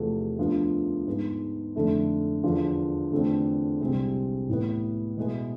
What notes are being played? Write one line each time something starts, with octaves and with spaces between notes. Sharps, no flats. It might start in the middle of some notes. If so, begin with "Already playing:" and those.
Already playing: E2 C3 F3 A3
D2 D3 F3 B3 F4
G#2 G#3 B3
F2 D3 A3 E4
E2 D3 F3
E2 D3 A3 C4 F4
C2 C3 G#3 C4 G#4
A2 E3 B3
B2 G#3 B3 E4 G#4